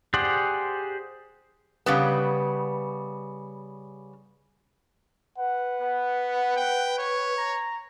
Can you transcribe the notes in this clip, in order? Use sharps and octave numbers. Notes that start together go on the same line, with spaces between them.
G4 G#4 C5 D5 F#5
C#3 G3 B3
B4 F#5
B3
G5
C#5
A#5